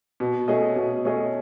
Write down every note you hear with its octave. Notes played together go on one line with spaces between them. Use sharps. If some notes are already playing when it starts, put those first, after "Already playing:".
B2
A3 C#4 G#4 D#5
B2
A3 C#4 G#4 D#5